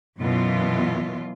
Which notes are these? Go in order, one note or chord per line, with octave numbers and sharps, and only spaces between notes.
F#2 B2 E3 F4